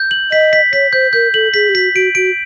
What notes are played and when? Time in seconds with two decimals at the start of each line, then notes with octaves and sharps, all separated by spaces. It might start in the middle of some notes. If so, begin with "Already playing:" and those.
Already playing: G6
0.11 F#7
0.32 D#5 B6
0.53 B6
0.73 C#5 B6
0.93 C5 G6
1.13 A#4 G6
1.34 A4 F#7
1.54 G#4 B6
1.69 G4
1.75 F#4 B6
1.95 F#4 D7
2.15 F#4 D7